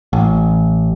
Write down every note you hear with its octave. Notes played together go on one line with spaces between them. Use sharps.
A1